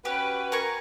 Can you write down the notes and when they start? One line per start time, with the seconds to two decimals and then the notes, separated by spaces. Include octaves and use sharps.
0.05 C#4 F#4 G4 B4
0.52 A#4 G#5 C#6